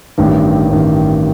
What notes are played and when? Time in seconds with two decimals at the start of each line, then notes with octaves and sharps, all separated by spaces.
0.18 A1 G2 D#3
0.70 A1 G2 D#3